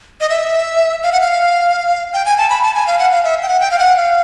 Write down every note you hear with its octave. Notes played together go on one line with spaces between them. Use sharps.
D#5
E5
F5
F#5
F5
G5
G#5
A5
B5
A5
G#5
F5
F#5
F5
E5
G5
F#5
G5
F5
F#5
F5